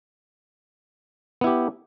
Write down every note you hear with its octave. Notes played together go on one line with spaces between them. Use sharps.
B3 E4 G4